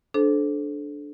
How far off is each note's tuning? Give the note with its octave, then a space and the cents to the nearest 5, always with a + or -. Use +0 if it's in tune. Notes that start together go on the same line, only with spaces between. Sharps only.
D4 +0 A4 -30 C5 +0